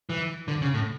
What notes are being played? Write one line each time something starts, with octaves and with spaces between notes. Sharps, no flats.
E3
D3
C#3
A2